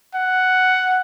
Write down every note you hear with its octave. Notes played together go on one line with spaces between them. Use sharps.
F#5